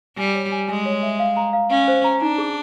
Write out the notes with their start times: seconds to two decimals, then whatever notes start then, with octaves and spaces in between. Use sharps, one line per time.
0.18 G3 G#5
0.35 C#5
0.52 G#5
0.69 G#3 G#5
0.86 C#5
1.03 E5
1.19 F5
1.37 A#5
1.53 F5
1.71 C#4 F5
1.88 C5
2.04 A#5
2.22 D4 D#4
2.38 G#4